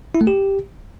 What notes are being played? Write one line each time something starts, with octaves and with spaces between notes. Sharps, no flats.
E4
A3
G4